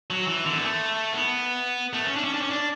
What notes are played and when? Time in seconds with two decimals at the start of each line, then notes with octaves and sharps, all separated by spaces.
0.10 F#3
0.27 E3
0.46 D3
0.56 B3
0.62 A3
1.13 B3
1.93 A3
2.05 C#4
2.16 D4
2.24 C#4
2.33 D4
2.41 C#4
2.50 D4